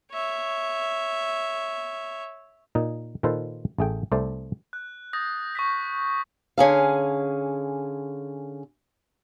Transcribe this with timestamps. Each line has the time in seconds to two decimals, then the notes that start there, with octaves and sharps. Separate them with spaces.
0.12 C#5 E5
2.75 A#2 D#4
3.23 A#2 D#3 F4 A4 B4 C5
3.79 A1 A3 G#4 G5
4.12 C2 A3 C5 D5
4.73 F#6
5.13 D#6 G6 A6 A#6
5.55 C#6 G6 B6
6.58 D3 C#4 G#4 F5